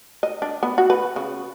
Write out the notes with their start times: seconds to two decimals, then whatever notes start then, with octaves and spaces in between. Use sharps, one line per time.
0.23 D#5
0.42 D4
0.63 B3
0.78 F#4
0.90 B4
1.16 C#3